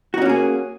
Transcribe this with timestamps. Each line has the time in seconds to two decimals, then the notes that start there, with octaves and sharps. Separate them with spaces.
0.14 F#4
0.18 D#4
0.22 C#4
0.26 A#3
0.29 G#4